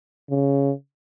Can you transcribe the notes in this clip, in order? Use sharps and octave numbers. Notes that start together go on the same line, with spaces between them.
C#3